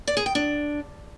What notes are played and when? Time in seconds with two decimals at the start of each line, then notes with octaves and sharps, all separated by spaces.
0.07 D5
0.17 G#4
0.26 G5
0.35 D4